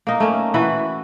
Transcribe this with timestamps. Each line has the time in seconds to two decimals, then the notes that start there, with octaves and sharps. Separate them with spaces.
0.07 A#3 D#4
0.20 A3 A#3 C#4
0.54 E3 E4 F#4 B4